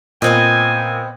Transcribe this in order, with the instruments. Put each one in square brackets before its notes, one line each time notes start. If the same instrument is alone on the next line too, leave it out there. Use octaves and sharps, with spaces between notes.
[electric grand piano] A#2 [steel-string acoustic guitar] B3 C4 D#5 [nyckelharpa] G#5